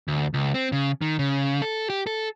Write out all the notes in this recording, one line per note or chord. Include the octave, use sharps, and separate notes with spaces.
D2
C#2
C4
C#3
D#3
C#3
A4
G4
A4